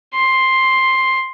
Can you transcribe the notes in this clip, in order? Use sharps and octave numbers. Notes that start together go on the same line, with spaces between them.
C6